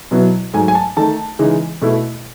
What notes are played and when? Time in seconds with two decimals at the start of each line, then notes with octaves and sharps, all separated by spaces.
0.11 B2 F#3 B3 E4
0.54 G#2 F#3 A3 D#4 G#5
0.68 G#5
0.75 A5
0.97 D#3 A3 D#4 A5
1.39 C#3 E3 G#3 D#4
1.82 B2 A3 E4